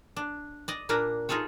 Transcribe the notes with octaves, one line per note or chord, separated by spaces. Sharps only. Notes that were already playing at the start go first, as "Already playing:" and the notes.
D4
D5 D#5
A#2 A#3 D4 A#4 B4
D#4 F4 G#4 A4 C#5